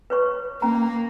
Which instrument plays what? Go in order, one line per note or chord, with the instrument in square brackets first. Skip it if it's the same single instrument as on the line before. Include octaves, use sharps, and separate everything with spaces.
[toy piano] B4 C#5 C#6
[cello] A#3 [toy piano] C#4 A#5